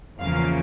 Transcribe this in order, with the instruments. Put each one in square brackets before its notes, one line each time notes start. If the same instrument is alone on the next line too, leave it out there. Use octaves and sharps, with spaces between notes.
[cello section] E2 C#3 F3 A#3 F5